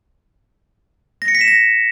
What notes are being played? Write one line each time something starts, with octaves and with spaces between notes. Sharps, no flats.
A#6
C#7
B6
E7
A#6